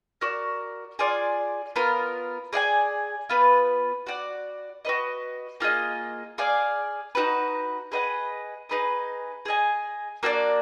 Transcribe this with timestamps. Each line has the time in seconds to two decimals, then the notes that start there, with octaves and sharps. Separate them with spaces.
0.21 F#4 A#4 D5
0.99 F4 G#4 D5 G#5
1.76 B3 F4 A#4
2.53 G#4 D5 F5 G#5
3.29 B3 F4 B4
4.07 F#4 D5 F#5
4.85 F#4 B4 D#5
5.60 A#3 F4 G#4 D#5
6.38 G#4 D5 F5 G#5
7.15 D#4 F#4 B4
7.92 G#4 B4 D#5 F#5
8.69 D#4 G#4 B4 D#5
9.45 G#4 D#5 G#5
10.23 A#3 D4 F#4 D5